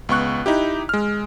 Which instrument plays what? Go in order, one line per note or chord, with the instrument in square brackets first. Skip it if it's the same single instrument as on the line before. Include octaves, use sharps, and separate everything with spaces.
[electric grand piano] C#2 B3 C#6 F#6
D#4 E4 G4
G#3 F6